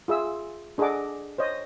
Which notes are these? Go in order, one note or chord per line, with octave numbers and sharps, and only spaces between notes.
F4 G#4 E5 E6
D4 G#4 A4 D#5 F#5 D6
C5 C#5 D#5